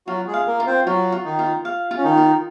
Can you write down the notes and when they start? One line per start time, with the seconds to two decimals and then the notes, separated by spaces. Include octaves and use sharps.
0.07 F#3 F4 F#4
0.28 G#3 G#4
0.34 F5
0.47 A#3 A#4
0.60 F4
0.66 C4 C5
0.86 F#3 F4 F#4
1.12 F4
1.25 D#3 D#4
1.39 F4
1.65 F5
1.91 F4
1.97 C#4
2.04 D#3 D#4
2.17 F4